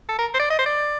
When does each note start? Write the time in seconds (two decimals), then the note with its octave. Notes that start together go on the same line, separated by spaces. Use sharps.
0.09 A4
0.19 A#4
0.34 C5
0.39 D5
0.50 D#5
0.59 C5
0.66 D5